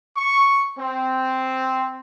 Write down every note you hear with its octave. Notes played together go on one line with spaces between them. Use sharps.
C#6
C4